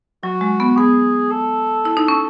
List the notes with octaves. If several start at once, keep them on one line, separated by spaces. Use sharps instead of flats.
F#3 F#4
G#3
B3
B3 G#4
A4
E4
D#4
C#4